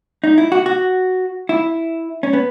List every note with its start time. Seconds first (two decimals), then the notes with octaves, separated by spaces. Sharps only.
0.24 D#4
0.38 E4
0.52 F#4
0.66 F#4
1.49 E4
2.23 C#4
2.33 B3